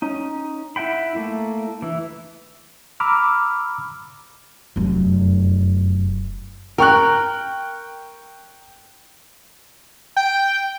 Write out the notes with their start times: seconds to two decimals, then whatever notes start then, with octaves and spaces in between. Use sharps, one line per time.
0.02 C#4 D#4
0.76 E4 E5 F#5 G5 B5
1.15 A3 A#3 E4
1.82 E3 E4
3.00 A#5 B5 D6 E6 F6
4.76 F1 F#2
6.78 A#4 G5 C#6 F#6
10.17 G5